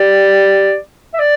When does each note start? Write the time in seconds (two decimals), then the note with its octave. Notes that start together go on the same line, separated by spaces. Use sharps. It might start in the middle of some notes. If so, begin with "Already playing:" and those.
Already playing: G4 D5
1.14 E5
1.19 D5